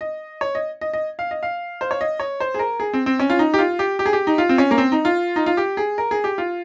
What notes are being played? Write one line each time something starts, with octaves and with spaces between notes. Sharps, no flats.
D#5
C#5
D#5
D#5
D#5
F5
D#5
F5
C5
C#5
D#5
C#5
C5
G#4
A#4
G#4
C4
C4
C#4
F4
D#4
G4
F4
G4
G4
G#4
G4
D#4
F4
C4
C#4
A#3
C4
D#4
F4
D#4
F4
G4
G#4
A#4
G#4
G4
F4